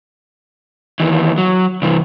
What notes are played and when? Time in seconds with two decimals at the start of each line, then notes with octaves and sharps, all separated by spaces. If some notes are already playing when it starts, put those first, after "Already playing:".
1.00 D#2 E3
1.38 F#3
1.82 C2 E3